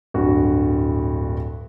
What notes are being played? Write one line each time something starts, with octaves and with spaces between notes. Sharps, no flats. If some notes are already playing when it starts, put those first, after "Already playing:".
D1 G2 F#4